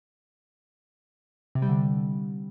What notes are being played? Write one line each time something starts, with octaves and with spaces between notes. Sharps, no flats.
C3
G3
D3